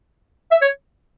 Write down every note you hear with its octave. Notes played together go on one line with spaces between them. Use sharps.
E5
C#5